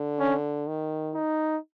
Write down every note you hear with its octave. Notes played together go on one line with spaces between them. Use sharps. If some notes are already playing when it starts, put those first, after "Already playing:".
Already playing: D3
C#4
D#3
D#4